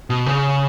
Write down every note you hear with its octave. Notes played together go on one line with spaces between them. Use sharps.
B2
C#3